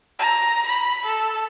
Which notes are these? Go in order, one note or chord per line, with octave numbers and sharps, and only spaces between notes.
A#5
B5
A4